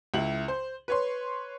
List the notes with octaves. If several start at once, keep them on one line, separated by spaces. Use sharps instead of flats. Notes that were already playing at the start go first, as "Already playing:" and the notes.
C#2 E4 F#7
C5
B4 C#5 C6